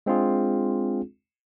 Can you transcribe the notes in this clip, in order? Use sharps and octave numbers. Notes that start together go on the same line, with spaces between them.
G#3 C4 D4 F4 G#4